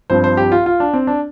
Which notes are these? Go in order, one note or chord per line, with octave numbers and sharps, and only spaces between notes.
G2 F3 C4 C5
C5
G4
F4
F4
D4
C4
D4